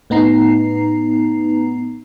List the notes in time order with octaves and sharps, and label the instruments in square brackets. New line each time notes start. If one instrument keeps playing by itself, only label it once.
[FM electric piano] A2 B3 D#4 A#5 C7